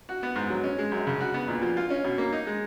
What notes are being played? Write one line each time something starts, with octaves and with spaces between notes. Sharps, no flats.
F#4
B3
G#2
F#3
C#4
G#3
F#2
C#3
F#4
B3
A#2
F3
F4
C#4
B2
A#3
D#4
G#3